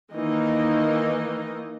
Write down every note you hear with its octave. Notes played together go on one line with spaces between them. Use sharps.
D#3 E3 A#3 D#4 D#5